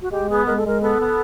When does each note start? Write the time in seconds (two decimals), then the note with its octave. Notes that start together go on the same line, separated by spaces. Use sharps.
0.02 F#4
0.11 G#3 G4
0.29 B3 G#4
0.46 G#3 A#4
0.57 A4
0.64 G#3 A#4
0.82 B3 A4
1.00 B3